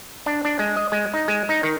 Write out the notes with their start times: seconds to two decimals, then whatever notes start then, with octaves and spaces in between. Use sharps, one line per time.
0.26 D4
0.45 D4
0.59 G#3
0.77 D#5
0.92 G#3
1.14 D#4
1.28 G#3
1.49 D#4
1.63 D#3